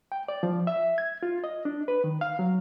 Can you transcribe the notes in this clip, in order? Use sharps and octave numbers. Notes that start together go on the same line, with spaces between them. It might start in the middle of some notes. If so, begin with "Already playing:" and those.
G5
D5
F3
E5
G#6
F4
D#5
D4
B4
D#3
F5
F#3